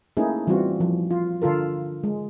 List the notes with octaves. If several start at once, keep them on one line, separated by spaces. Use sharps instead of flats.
A3 A#3 C#4 D#4 E4 G#4
E3 G3 C4 F4 F#4
F3
F4
D3 F4 A4 A#4
G#3